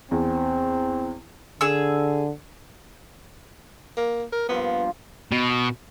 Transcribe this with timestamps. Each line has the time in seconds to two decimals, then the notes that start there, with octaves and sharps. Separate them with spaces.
0.11 E2 C4
1.61 D3 G#4 E6
3.97 A#3
4.32 A#4
4.48 G2 F3 A#3 B3
5.32 B2